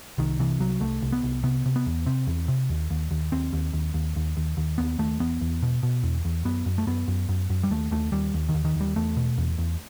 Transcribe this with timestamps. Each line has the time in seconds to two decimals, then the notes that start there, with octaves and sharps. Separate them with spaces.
0.18 C2 D#3
0.40 C3 E3
0.60 C2 F#3
0.81 C2 A3
1.02 C2
1.12 B3
1.23 C2
1.43 C3 B3
1.66 C3
1.76 B3
1.86 E2
2.06 C3 C4
2.27 E2
2.48 C3
2.69 D#2
2.91 D#2
3.11 D#2
3.32 D#2 C4
3.53 D#2
3.73 D#2
3.94 D#2
4.16 D#2
4.37 D#2
4.57 D#2
4.78 D#2 B3
4.99 D#2 A3
5.20 E2 B3
5.41 E2
5.62 B2
5.83 B2
6.03 E2
6.25 E2
6.45 F#2 B3
6.66 F#2
6.78 A3
6.87 F#2 B3
7.08 F#2
7.29 F#2
7.50 F#2
7.63 G3
7.71 D#2 A3
7.91 D#2 A3
8.12 D#2 G3
8.34 D#2
8.49 D#3
8.54 D#2
8.65 D#3
8.75 D#2
8.80 G3
8.96 E2 A3
9.16 B2
9.38 E2
9.58 E2